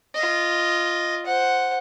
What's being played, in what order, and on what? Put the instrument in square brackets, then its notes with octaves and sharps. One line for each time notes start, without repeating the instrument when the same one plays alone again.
[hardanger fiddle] F4 D#5
C5 F#5